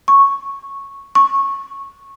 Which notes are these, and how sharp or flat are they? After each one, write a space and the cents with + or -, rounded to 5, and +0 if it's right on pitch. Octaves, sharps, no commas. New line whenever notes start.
C#6 -5
C#6 -15